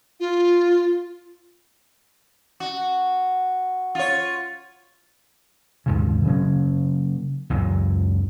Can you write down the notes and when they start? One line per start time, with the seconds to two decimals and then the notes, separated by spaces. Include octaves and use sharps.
0.20 F4
2.60 F#4
3.95 F4 C#5
5.86 D#2 G#2 C#3
6.25 C#3 F#3 A#3 C#4
7.50 C#2 F#2 A#2 F#3